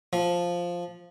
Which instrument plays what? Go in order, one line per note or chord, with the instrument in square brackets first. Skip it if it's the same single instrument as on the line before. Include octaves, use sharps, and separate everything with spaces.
[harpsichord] F3